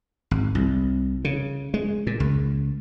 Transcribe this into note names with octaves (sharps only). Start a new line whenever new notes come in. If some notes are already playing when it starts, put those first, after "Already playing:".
G#1
C2
C#3
G#3
A#2
C#2